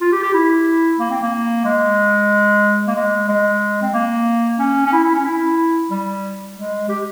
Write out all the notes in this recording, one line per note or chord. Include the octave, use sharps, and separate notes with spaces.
F4
G4
G4
E4
A#3
C4
A#3
G#3
A#3
G#3
G#3
C4
A#3
C#4
C#4
E4
E4
C#4
E4
G3
G#3
G4